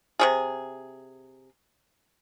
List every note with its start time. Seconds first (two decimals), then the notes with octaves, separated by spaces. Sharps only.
0.19 C3 G3 G#4